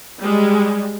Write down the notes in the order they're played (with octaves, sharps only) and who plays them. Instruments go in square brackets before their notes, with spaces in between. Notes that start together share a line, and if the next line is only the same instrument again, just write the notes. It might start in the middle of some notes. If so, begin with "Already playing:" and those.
[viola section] G3 G#3